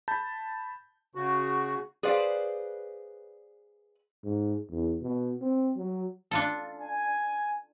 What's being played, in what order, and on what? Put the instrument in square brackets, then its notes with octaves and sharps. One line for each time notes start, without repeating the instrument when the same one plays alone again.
[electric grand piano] A5 B5 G6
[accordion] C#3 F#4
[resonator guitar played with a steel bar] G#4 B4 C5 D5 F5
[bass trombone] G#2
E2
B2
C4
F#3
[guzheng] D4 F4 A4
[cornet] G#5